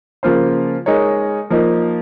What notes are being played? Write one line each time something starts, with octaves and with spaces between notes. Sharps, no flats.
C#3 F3 A#3 F4 C5
G#3 D#4 A#4 C#5
F3 A#3 D#4